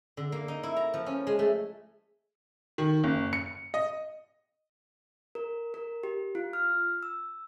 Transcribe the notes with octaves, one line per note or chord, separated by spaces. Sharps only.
D3
A#3
D#4
E4
A#5
F3
C#4
G#3
A3
D#3
F#1
C#7
D#5
A#4
A#4
G4
F4
F6
E6